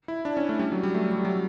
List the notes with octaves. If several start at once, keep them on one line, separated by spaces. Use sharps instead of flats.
E4
D4
C#4
A3
G3
F#3
G3
A3
G3
F#3